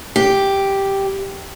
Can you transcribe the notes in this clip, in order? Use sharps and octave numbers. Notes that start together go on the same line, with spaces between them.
G4